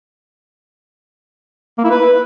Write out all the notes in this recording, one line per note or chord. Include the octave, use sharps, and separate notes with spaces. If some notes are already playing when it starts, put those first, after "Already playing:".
A#3
E4
B4